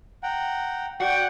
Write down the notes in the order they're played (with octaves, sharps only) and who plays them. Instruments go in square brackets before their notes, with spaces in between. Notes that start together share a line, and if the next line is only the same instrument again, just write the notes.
[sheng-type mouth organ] F#5 G5 A#5
[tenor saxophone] F#4 [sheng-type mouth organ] D5 [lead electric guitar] F#5 [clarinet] G5